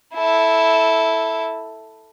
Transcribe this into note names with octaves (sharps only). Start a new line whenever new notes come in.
E4 A4